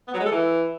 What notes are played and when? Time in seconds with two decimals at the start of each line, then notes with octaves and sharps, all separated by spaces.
0.08 B3
0.14 F#3
0.20 G#3
0.26 A4
0.32 E3